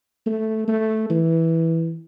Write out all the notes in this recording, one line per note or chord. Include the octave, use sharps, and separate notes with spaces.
A3
A3
E3